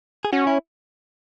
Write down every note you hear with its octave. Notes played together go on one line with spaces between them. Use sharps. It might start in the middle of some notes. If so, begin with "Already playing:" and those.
G#4
C#4 F#4
E4